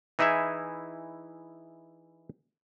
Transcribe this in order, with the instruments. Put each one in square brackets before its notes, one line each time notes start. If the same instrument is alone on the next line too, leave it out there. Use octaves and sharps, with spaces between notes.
[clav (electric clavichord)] E3 D#4 E4 G#4 E5